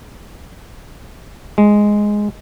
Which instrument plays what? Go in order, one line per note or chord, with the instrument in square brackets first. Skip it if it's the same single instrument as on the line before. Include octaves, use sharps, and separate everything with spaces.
[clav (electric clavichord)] G#3